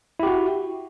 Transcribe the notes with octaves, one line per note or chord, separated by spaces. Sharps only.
E4 F#4 G4